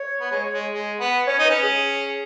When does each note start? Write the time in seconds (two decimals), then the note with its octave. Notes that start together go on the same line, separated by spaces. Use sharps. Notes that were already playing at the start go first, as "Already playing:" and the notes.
Already playing: C#5
0.20 B3
0.31 G#3
0.52 G#3
0.74 G#3
1.00 B3
1.27 C#4 C#5
1.39 D#4
1.45 B4
1.50 C#4
1.63 G#4